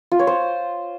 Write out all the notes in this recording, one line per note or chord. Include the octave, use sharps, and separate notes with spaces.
F4
C#5
C5